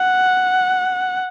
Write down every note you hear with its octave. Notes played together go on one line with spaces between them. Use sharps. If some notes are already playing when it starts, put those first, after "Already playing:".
Already playing: F#5